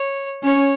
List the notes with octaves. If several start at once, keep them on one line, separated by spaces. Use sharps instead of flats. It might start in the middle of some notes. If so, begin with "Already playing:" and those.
Already playing: C#5
C#4 C#5